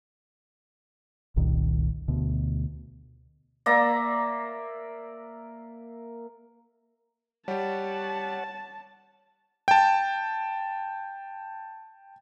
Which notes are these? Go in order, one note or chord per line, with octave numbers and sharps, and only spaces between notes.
F#1 C2 A#2 D#3
D2 B2
A#3 D5 E5 A#5
G3 G4 C#5 F#5 A5
G5 A5